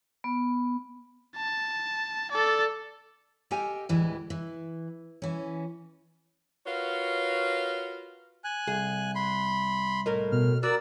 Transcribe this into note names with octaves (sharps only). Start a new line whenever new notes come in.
B3
A5
A4 D5
G4 A4 D#5 F5 G5 G#5
D2 A2 E3 G#3 G4
E3
E3 C#4
F4 F#4 A#4 B4 C#5 F5
G#5 F#6
C2 G#4
B5 C6
A2 A#4 D#5
B2 F6
F#4 A#4 D5 E6